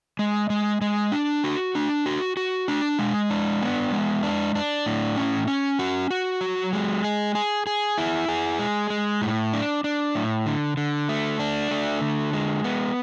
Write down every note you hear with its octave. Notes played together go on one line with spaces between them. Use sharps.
G#3
G#3
G#3
D4
F#4
D4
F#4
F#4
D4
G#3
D4
B3
G#3
D4
D4
A2
C#4
C#4
F#4
F#4
F#3
G#3
G#4
G#4
G#4
E4
G#4
G#3
G#3
A2
D4
D4
A2
D3
D3
A3
D4
A3
D3
G#3
B3